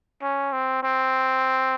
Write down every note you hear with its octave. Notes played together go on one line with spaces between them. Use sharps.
C#4
C4
C4